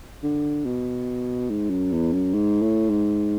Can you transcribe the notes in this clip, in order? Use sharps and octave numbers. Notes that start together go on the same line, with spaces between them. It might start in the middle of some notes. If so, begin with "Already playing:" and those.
D3
B2
G#2
F#2
E2
F#2
G#2
A2
G#2